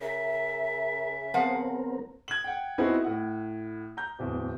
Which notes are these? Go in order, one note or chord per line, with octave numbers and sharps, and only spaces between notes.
C#3 A#4 E5
F3 B3 C4 A#4 F5 F#5
G#6 F#7
F#5 G5
B3 C4 D#4 E4 F#4 G#4
A2 F#5
A#5 G6
D1 E2